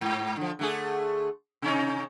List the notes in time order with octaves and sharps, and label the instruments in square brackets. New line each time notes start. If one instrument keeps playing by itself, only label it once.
[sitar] G#2
D3 F3
D3 A3 G#4
C3 C#4 D#4